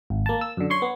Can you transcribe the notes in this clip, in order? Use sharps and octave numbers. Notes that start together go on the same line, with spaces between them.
G#1
A#3 A5
E6
F#2 D3
C#5 C6 C#6
B3